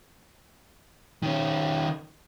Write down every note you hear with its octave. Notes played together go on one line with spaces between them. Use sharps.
D#3 C#4